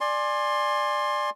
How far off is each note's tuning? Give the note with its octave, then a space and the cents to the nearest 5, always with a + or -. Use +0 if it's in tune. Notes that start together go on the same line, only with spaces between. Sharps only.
D5 +15 G#5 +0 C6 +20